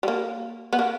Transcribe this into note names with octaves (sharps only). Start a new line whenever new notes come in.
G3
A#3
B3
A#3